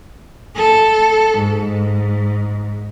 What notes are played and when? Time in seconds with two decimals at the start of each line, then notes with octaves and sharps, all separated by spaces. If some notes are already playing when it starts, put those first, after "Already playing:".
0.54 A4
1.37 G#2